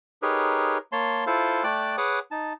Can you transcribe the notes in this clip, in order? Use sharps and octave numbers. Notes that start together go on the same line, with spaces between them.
D#4 G4 G#4 A#4 B4 C#5
A#3 C#5 A5 C6
E4 F4 A4 C5 F5
A3 D5 G5 A5 D6 F#6
G#4 B4 C#5 F#5 D6 D#6
D#4 A5